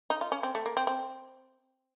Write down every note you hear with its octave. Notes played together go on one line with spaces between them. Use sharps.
D#4
F4
C#4
C4
A3
A#3
C4
C4